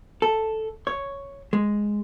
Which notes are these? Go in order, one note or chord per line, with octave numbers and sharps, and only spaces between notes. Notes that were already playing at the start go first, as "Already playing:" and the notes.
A4
C#5
G#3